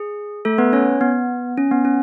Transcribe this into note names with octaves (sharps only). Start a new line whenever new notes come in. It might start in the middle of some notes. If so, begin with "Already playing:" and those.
Already playing: G#4
A3 A4
B3 B4
C#4 C#5
B3
C#4
B3
C#4